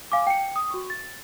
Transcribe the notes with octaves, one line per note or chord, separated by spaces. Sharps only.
F5 G#5 D6
G5 C#7
D#6
F#4 C#6
A6